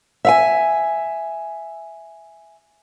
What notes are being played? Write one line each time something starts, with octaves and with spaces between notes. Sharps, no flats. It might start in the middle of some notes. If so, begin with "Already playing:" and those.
E5 F5 G#5